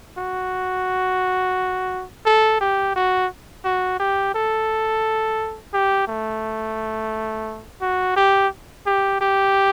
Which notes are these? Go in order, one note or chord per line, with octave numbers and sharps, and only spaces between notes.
F#4
A4
G4
F#4
F#4
G4
A4
G4
A3
F#4
G4
G4
G4